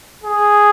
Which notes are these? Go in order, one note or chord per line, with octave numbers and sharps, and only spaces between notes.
G#4